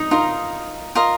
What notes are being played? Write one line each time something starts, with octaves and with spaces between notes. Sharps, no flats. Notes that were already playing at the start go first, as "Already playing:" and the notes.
Already playing: D#4
D#4 F4 A#4 D#5
F4 A#4 D#5